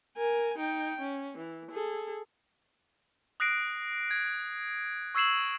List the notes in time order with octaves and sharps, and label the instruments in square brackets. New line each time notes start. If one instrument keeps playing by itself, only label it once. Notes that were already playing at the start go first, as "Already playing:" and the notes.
[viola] A#4 G#5
D#4 G5
C#4
E3
G#4 A4
[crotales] D#6 F#6 A#6 C7 D7
G#6
C#6 E6 G#6 C7 E7 F#7